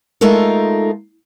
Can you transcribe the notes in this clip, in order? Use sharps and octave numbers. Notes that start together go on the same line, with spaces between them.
G#3 A3 D#4 F4 A4 A#4